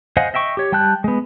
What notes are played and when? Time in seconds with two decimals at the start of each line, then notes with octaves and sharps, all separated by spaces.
0.17 C5 D#5 F5 F#5 G#5
0.34 D#5 E5 G5 C#6
0.57 G4 C#5
0.72 G3 G5 A5 F#6 G6
1.04 G#3 B3